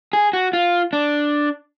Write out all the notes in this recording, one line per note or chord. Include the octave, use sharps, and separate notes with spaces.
G#4
F#4
F4
D4